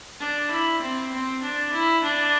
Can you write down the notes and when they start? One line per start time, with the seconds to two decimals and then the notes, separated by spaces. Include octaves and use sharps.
0.20 D4
0.51 E4
0.81 C4
1.12 C4
1.42 D4
1.73 E4
2.03 D4